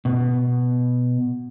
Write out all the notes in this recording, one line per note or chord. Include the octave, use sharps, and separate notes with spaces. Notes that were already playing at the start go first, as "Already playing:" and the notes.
B2